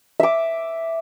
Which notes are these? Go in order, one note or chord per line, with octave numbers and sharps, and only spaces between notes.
E5 D6